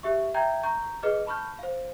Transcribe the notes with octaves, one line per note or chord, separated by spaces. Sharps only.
G4 E5 C#6
E5 G5 A#5 G6 G#6
A#5 C#6 G6
G#4 B4 D#5 D6 F6
A5 B5 C#6 F6 G6
C5 F5